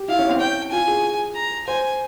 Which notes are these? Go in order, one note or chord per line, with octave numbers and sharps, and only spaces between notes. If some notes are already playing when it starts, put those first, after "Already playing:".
Already playing: G4
E4 F5
C#4
C4
C#4 G5
F4 G#5
G#4
A#5
C5 G#5